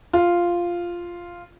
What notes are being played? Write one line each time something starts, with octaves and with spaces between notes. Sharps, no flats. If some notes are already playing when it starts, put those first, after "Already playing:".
F4